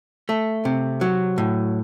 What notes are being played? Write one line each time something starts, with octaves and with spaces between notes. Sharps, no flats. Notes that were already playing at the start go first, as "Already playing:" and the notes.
A3
C3
F#3
A2